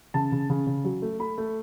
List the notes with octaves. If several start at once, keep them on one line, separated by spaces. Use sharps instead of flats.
C#3 A5
C#3
C#3
C#3
F#3
A3
A3 B5
A3